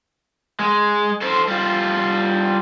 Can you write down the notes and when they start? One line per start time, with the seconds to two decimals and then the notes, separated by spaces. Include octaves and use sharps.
0.59 G#3
1.22 A4 C5
1.49 G3 F4